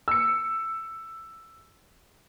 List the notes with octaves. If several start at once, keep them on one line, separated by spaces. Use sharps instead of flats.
E6 C#7